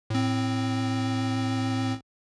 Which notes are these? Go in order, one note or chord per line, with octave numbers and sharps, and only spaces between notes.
A2 C4